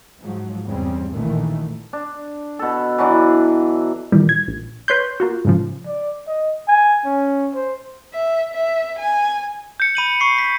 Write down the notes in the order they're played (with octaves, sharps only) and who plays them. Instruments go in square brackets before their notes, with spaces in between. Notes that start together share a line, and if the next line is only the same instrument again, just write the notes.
[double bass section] G#2 F3 F#3
E2 G2 C#3 G3 C4
A#1 F#2 A#2 D#3 E3 A3
[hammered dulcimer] D4
B2 A4
E3 F#3 D4
[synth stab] A#2 D#3 E3 G3
G#6
A#1
B4 C#5 C6 G6
A#3 F4 F#4
G#2 C#3 F3
[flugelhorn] D5
D#5
G#5
C#4
C5
[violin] E5
E5
G#5
[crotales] G6 C#7
[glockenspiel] B5 D#7 F#7
C#6 C7
B6